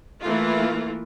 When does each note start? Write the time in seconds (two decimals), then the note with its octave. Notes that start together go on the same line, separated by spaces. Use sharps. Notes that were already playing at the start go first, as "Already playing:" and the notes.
0.22 E3 A3 A#3 E4 F4